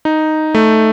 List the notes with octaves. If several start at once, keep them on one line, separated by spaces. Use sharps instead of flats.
D#4
A3